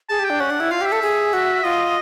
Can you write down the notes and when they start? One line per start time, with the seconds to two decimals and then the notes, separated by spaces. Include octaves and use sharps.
0.09 G#4 A5
0.19 G4 G5
0.30 D4
0.40 C#4 F#5
0.50 D4
0.60 E4
0.71 F4 F5
0.81 G4 E5
0.92 A4
1.02 G#4
1.33 F#4
1.64 F4 D#5